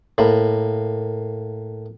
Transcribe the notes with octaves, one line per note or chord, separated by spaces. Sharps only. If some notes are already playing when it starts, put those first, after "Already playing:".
A2 A#3 B5